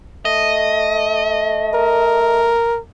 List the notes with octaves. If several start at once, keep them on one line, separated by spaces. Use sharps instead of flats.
A3 D#5
A#4